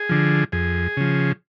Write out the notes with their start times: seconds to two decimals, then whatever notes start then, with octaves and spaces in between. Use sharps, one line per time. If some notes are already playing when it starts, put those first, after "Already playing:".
Already playing: G#4
0.09 D3 F3
0.52 F2 G#4
0.97 C#3 F3